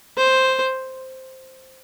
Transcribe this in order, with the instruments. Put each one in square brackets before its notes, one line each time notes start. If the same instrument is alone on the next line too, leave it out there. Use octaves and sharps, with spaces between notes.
[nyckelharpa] C5